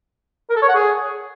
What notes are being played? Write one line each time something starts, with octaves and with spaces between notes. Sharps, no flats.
A#4
A4
C#5
F#5
G#4